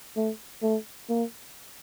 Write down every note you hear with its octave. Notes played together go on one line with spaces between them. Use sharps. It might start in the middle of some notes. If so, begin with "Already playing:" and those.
A3
A3
A#3